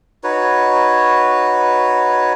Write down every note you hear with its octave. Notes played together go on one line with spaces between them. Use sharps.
D#4 F#4 B4 C#5